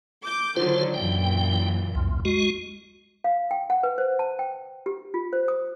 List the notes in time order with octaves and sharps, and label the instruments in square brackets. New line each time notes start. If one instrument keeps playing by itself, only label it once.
[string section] D6 G6
[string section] D3 D#3 F#3 [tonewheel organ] F4 C5
[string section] F#2 A#2 E3 [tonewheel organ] G5
[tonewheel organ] C2 F2
G#3 F#4
[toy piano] F5
G5
F#5
B4
C5
A5
G5
G4
F4
C5
D#6